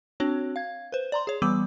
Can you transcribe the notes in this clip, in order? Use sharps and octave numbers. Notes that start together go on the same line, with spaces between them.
C4 D4 F#4 C#5
F5 G#6
B4 C5
D5 A#5 C6
G#4 C#5
E3 G3 B3 D6 E6